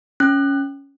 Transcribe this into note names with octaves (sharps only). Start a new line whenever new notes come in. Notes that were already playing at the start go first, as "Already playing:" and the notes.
C#4 F#6